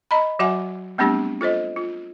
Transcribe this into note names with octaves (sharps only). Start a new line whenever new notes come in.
D#5 A#5 B5
F#3 F#4 E5 F#5 G#5
G3 A3 B3 C4 D4 G4
F4 A4 C5 D#5
F4